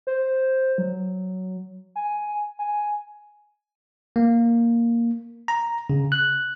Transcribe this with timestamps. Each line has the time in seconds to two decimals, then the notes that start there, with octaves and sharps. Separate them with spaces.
0.07 C5
0.78 F#3
1.96 G#5
2.59 G#5
4.16 A#3
5.48 A#5
5.90 C#3
6.12 F#6